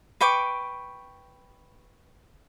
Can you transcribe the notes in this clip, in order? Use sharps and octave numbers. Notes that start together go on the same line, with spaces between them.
B4 G5 C#6 D6